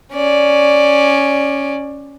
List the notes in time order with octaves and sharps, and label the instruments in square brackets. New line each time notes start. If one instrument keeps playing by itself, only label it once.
[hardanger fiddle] C#4 D5